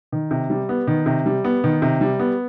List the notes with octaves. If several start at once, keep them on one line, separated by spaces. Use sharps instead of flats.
D#3
C3
G3
B3
D#3
C3
G3
B3
D#3
C3
G3
B3